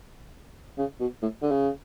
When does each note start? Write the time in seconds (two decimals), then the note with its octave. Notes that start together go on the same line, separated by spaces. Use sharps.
0.78 C#3
1.00 B2
1.22 A2
1.42 D3
1.51 C#3